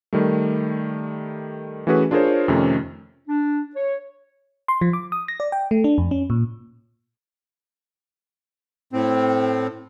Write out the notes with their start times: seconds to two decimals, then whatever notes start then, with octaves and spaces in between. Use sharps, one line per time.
0.13 D#3 G3 A3
1.87 E3 A3 C#4 F#4 G#4 B4
2.11 D4 F4 G#4 A#4 C5 C#5
2.48 F2 C3 D#3 A3 C#4
3.28 D4
3.76 C#5
4.68 C6
4.81 F3
4.93 D6
5.12 D#6
5.28 A#6
5.40 D5
5.52 G5
5.71 A3
5.84 D4
5.98 F2
6.11 C#4
6.30 A#2
8.93 A2 C4